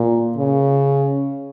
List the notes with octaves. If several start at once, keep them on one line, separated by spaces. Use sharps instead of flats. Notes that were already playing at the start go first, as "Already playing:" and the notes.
Already playing: A#2
C#3